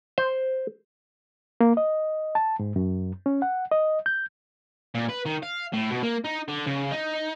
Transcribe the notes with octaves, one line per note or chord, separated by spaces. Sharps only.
C5
A#3
D#5
A5
G#2
F#2
C#4
F#5
D#5
G6
A#2
B4
D#3
F5
A2
B2
A#3
D#4
D3
C#3
D#4